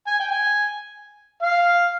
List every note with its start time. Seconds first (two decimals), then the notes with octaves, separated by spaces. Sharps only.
0.07 G#5
0.19 G5
0.31 G#5
1.43 F5